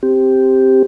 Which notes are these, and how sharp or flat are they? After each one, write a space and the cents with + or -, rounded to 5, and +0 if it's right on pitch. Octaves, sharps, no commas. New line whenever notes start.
C4 +0 G4 +0